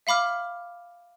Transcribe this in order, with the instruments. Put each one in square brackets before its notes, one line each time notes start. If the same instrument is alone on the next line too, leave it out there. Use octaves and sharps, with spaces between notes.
[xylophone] E5 F5 B5 D6 F6